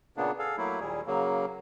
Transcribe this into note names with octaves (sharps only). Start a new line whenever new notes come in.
A#2 C#3 A#3 B3 D4
G#4 A4 F5
F#3 A3 A#3 E4
D#2 A#2 G3 G#4
C#3 F#3 A#3